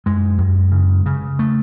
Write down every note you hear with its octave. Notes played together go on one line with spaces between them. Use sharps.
F#2 G#3
F#2
C#3
C#3
A3